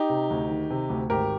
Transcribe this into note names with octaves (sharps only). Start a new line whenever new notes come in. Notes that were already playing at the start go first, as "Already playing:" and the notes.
Already playing: D#4 G4
C3
D2
D#3
C3
D2
G#1 G4 A#4